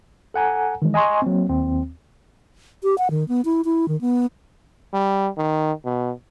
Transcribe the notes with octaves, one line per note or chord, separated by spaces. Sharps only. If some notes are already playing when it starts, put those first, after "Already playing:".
A4 F#5 G#5 A#5
D#3 E3 G#3
D#5 G#5 A#5 C6 C#6
F#3 A#3 C4
D#2 C4
G4
F#5
D#3
B3
E4
E4
D#3
B3
G3
D#3
B2